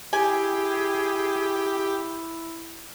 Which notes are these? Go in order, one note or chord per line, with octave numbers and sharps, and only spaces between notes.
E4 G4 G#4 G#5